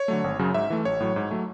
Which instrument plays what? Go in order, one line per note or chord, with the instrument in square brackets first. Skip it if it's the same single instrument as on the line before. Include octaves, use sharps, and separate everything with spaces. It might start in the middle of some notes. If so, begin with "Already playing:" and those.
Already playing: [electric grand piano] C#5
D3 F#3 A3
G#1
F#2 C#3 F#3
G#2 E5
E3 A3
A1 C#5
A2 F#3
G#2
F#3 A3